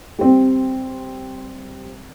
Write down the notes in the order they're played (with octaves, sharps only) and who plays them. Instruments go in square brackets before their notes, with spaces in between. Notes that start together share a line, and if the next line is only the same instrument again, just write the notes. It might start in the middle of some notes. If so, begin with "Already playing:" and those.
[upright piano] G3 C4